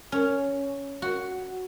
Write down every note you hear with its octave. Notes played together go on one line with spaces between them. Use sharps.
C#4
F#4